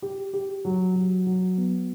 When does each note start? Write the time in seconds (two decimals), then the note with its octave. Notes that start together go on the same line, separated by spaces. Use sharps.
0.02 G4
0.33 G4
0.65 F#3
0.96 F#3
1.27 F#3
1.58 B3